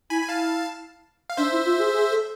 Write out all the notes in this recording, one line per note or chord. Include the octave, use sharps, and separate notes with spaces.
E4 G#5 B5
G#5
E4 F5 A5
F5
D4 C5 E5
E4
F4
G#4
G#4
A4